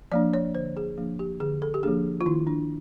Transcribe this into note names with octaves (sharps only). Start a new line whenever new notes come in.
F3 A#3 D4 D5
C#5
D3 C5
G#4
F3 A#3 D4
G4
D3 G#4
A4
G4
F3 A#3 D4 G#4
F4
D#3 E4
D4